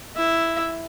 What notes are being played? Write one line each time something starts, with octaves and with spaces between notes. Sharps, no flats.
E4 E5